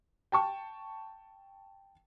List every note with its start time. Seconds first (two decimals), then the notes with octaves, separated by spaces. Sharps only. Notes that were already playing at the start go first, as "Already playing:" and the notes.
0.32 G5 A5 C#6